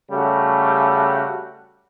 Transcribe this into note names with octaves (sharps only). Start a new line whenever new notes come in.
C#3 G3 A3 F#4